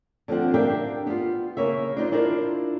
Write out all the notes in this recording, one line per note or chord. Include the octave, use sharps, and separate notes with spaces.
D3 F3 C4 F#5
D4 G4 A#4 E5 F5 G5
B3 F4
C#3 A#3 C#5 E5
D4 D#4 F4 C5
D4 E4 F4 A#4 B4 D5